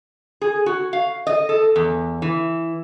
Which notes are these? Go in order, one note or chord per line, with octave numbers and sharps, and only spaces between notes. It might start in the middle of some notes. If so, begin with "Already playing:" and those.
G#4
F#4
F5
D#5
A4
E2
E3